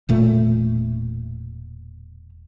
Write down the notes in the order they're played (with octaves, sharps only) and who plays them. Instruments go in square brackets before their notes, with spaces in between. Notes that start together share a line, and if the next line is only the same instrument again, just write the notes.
[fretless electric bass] E1 A#2 A3